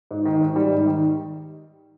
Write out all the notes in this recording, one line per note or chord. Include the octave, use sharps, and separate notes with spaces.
G#2
D#3
G#2
G3
G#2
D#3